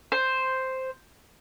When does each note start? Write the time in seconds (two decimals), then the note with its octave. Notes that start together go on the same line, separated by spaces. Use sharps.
0.12 C5